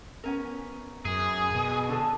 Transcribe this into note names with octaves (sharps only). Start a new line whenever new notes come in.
B3 C#4 A#4
F#2 G#4
B2
D3 A4